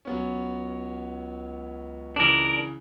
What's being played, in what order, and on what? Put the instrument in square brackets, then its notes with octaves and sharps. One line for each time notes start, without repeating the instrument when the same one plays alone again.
[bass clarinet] C#2 [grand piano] F#3 B3 C#4
[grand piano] C#3 E3 [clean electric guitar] D4 A#4